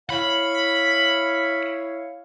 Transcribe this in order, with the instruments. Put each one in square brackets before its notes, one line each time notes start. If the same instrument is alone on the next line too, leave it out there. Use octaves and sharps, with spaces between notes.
[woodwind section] E4 C#5 F5 [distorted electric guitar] B5